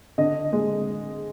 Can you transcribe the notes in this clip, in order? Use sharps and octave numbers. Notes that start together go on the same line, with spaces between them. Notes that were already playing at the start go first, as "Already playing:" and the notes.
D3 D#5
G#3